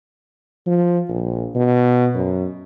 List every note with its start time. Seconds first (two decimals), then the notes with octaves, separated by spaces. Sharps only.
0.67 F3
1.09 A#1
1.55 B2
2.14 F#2